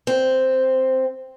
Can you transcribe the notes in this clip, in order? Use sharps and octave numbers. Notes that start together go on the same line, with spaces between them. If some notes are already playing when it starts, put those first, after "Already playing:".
C4